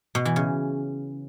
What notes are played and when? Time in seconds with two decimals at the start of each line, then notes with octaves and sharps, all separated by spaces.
0.15 B2
0.25 E3
0.36 C#3